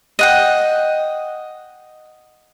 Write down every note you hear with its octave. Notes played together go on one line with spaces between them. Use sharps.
D#5 F#5 G5